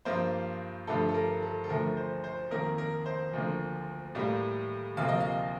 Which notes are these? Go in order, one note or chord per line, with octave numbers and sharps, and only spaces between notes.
G2 F3 A#3 C5
G2 D3 F3 A3 A4
A4
A#4
A4
A4
D2 D3 F3 A3 A#4
C5
C5
F2 D#3 A#3 A#4
A#4
C5
D2 D3 F3 A#3
A2 G3 A#3 F5
D2 C3 F3 A#3 F5
D#5
F5